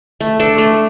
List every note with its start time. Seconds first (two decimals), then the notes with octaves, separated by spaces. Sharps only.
0.20 A3
0.40 D4 A4
0.58 A3